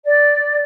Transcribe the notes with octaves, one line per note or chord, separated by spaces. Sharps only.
D5